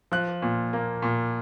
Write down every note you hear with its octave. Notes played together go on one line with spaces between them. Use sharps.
F3 F#6
A#2
A#3
A#2